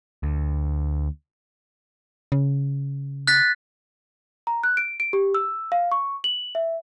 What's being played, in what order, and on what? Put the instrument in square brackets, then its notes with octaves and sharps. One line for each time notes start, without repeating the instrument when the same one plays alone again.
[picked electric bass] D2
[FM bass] C#3
[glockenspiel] F#6 A6 B6
[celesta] A#5
F#6
D7
D7
G4
E6
F5
C#6
F#7
E5